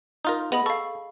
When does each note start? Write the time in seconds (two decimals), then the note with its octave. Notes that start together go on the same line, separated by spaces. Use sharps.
0.25 D#4 F4 A#4
0.52 B3 G#4 D#5 B5
0.66 A4 F5 C#6